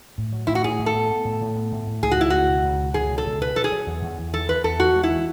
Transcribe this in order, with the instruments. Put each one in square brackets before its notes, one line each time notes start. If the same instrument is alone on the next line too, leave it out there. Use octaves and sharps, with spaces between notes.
[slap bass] A2
F#3
[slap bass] A2 [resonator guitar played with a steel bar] E4
[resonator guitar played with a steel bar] F#4
[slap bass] A2 [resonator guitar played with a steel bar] G#4
[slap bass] A2
[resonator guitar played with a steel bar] A4
[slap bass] B3
B3
A2
A2
B3
A2
A2
[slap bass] C#2 [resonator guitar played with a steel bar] G#4
[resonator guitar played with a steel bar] F#4
[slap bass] C#2 [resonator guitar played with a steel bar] E4
[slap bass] C#2 [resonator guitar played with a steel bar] F#4
[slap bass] B2
C#2
B2
[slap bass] C#2 [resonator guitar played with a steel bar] G#4
[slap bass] B2
[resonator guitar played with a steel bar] A4
[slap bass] C#2
[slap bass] B2 [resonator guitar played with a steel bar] B4
[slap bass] F#3 [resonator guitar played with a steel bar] A4
[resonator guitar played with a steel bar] G#4
[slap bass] F#3
E2
E2
E2
[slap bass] E3 [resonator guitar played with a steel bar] A4
[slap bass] E3 [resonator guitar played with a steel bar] B4
[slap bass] E2 [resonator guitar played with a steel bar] A4
[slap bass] E2 [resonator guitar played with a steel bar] F#4
[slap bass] G#3
[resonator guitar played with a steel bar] E4
[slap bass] E3